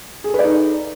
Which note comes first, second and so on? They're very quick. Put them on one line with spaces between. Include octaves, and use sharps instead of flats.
G#4 A4 B4 D5 D#4